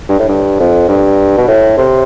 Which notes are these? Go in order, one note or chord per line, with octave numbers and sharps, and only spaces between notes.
G2
A2
G2
F2
G2
B2
A2
C3